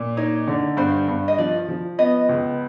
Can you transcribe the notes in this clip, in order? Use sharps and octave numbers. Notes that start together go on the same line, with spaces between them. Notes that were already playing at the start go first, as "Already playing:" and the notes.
Already playing: A#2
D#4 C#5
D3
G2 C5
G2
D#5
F3 D5
F3
B3 D#5
C#2